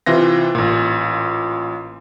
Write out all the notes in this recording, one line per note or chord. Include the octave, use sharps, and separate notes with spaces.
C3 E3 F4 A#6
A1 A#2